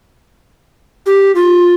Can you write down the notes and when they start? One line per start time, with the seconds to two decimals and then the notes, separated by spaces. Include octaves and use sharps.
1.06 G4
1.35 F4